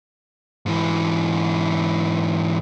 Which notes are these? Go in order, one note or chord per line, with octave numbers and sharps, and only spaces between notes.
G#2 E3